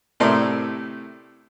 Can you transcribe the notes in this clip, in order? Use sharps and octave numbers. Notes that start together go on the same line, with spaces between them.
A2 C3 A3 A#4 D5 C6